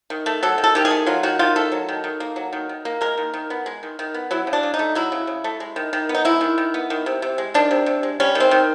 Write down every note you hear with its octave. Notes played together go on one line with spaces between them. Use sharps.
D#3
A3
F#3 A4
D#3
A4
D#3 G4
G#4
A3
F#3 F4
D#3 F#4
D#3 F4
A3 A4
F#3
D#3
D#3
A#3
F#3
D#3
D#3
A#3
G#3 A#4
D#3
D#3
B3
G#3
D#3
D#3
B3
F#3 E4
C#3
D4
C#3
D#4
A3
F#3 E4
C#3
C#3
A3
G#3
D#3
D#3
B3
D#4
G#3 E4
D#3
D#3
B3
D#3
C3
C3
G#3
D#3 D4
C3
C3
G#3
G3 C#4
D#3
C4
D#3